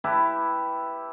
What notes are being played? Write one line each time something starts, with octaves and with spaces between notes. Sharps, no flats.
E4 G4 B4 A5